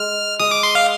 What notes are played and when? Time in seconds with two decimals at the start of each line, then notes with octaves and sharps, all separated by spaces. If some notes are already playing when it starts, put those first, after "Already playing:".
Already playing: G#3 F6
0.39 G#3 D#6
0.51 D6
0.63 C6
0.75 F5